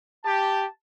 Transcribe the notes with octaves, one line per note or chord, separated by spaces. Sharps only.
G4 A5